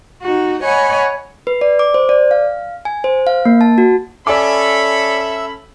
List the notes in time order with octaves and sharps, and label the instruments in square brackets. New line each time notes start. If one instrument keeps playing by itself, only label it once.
[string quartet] D#4 F#4
C#5 D#5 F#5 G#5 B5
[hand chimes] B4
D5
D6
C5
D5
F5
G#5
C5
F5
A#3
A5
F#4
[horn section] C#4 A4 B5 [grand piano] D5 G#5 D6 [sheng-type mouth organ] E5 E6